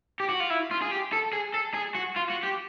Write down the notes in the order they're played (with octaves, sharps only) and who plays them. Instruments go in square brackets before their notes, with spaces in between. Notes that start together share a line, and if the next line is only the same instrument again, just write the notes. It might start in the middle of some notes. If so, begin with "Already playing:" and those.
[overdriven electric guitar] G4
F#4
F4
E4
F4
G#4
G4
A4
G#4
A4
G#4
F#4
F4
F#4
G4